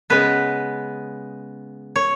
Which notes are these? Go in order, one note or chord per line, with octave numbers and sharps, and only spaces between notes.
C#3 G#3 B3 B4
C#5